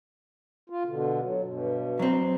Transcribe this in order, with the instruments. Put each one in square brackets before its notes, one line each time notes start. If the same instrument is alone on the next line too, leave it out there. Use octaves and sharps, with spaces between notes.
[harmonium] F4
B2 D3
F#3
G2 B2
[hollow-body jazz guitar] F#3 C4